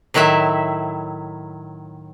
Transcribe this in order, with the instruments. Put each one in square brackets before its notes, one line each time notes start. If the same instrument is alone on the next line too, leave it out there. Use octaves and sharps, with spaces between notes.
[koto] A2 D#3 F#3 E4 E5